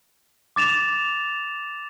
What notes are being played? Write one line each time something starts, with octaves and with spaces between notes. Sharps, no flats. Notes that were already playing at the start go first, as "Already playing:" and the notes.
D6 A6 E7 F7